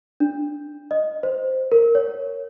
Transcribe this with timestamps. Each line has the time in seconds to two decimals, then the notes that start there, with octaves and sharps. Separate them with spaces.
0.20 D4
0.91 D#5
1.23 C5
1.72 A#4
1.95 C#5